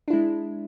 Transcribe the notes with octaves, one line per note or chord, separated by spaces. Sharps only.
G#3 D4 E4